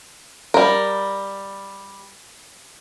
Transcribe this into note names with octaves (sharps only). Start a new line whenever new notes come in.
G3 A#4